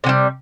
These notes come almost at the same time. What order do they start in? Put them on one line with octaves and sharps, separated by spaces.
C3 F#3 G3